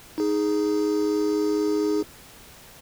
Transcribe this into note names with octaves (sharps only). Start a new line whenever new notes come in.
D#4 G#4